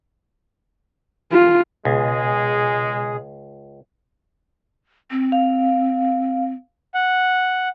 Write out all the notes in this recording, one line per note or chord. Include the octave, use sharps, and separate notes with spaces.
F4
C#2 B2 G#3 G#4
C4
F5
F#5